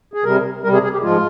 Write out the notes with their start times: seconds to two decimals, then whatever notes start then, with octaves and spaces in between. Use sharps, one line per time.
0.14 G#4
0.24 C3 G3 A#4
0.64 C3 G3 A#4
0.74 G#4
0.84 G#4
0.93 G4
1.03 G#2 F3 G#3 F4